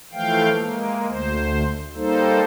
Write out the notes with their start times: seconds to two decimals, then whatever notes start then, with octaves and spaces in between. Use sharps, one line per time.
0.12 E3 F3 A3 F5 G5
0.53 G#3 A#3
1.07 D2 C5
1.95 G3 A#3 D#4 A4 C5